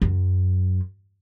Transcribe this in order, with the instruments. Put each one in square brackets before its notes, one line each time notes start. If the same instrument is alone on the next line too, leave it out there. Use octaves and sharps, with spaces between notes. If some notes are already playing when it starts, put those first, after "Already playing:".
[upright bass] F#2